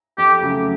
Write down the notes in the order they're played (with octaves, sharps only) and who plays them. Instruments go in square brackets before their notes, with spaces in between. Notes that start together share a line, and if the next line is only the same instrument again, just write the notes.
[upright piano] F2 [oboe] G4
[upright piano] C#3 F#3 A3